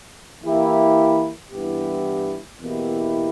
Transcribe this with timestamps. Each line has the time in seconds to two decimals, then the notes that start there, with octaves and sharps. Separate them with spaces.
0.43 E3 A#3 E4 G4
1.51 G2 E3 B3 E4 G4
2.60 E2 B2 A#3 E4 G4